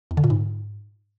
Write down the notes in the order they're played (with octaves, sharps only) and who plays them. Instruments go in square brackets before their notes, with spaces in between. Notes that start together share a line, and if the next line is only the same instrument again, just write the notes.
[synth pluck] E2
D3
A#2
G#2